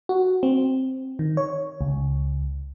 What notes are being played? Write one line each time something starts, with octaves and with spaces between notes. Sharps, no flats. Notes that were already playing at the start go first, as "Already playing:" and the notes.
F#4
C4
D#3
C#5
C#2